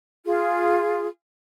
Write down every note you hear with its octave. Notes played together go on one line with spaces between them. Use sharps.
F4 G#4